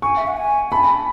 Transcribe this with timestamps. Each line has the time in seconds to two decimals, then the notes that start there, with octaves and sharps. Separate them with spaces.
0.02 G#5 C#6
0.17 E5
0.27 F#5
0.36 G#5
0.71 A5 B5
0.83 G#5
0.94 A5